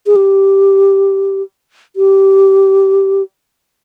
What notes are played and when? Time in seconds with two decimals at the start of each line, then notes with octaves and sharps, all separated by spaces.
0.06 G#4
0.16 G4
1.96 G4